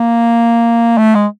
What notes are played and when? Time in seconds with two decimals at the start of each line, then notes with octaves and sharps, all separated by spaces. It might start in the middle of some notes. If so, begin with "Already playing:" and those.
Already playing: A#3
0.98 A3
1.15 G#3